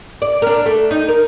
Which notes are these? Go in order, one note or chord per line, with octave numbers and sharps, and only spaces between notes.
D5
D4 A#4
A3
D#4
A#4